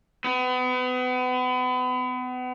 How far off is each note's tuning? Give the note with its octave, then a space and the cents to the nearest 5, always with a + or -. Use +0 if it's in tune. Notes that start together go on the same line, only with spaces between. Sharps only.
B3 +35